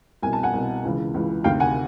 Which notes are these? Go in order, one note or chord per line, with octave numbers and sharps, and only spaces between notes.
C2 B2 G#5
A5
F#5 G#5
C2 B2
C#2 C#3 E3
C#2 C#3 E3
D2 C3 D#3 F5 G5
F#5 G#5